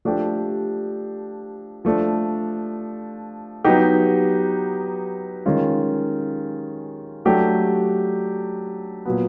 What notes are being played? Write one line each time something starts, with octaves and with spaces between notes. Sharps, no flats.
F3 A3 D4 G4
F3 A3 D4
F#3 B3 D#4 G4
D#3 G#3 C#4 F4
F#3 A3 D4 G4
A#2 F#3 B3